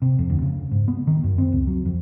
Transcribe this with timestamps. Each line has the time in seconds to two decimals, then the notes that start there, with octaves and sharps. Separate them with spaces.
0.02 C3
0.19 F2
0.30 D2
0.42 C#3
0.71 G#2
0.88 B3
1.07 D#3
1.24 F#2
1.38 C4
1.52 C#2
1.67 F#3
1.85 F2